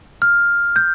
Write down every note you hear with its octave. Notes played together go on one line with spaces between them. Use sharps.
F6
G6